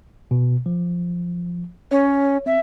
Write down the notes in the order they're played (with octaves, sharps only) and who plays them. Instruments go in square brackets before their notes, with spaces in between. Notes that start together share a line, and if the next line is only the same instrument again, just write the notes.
[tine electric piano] B2
F3
[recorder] C#4 [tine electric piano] C#5
[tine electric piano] C4 [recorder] E5